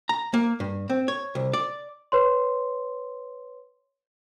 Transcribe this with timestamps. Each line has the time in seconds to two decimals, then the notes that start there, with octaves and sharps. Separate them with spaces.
0.09 A#5
0.34 A#3
0.60 G2
0.90 C4
1.08 C#5
1.35 C2
1.53 D5
2.12 B4 C#5 C6